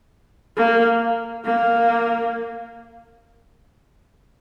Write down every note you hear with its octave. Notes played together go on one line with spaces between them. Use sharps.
A#3
A#3